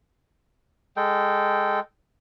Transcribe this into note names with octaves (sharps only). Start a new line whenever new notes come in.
G#3 A4 G5